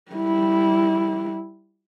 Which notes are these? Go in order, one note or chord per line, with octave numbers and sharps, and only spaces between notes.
G3 E4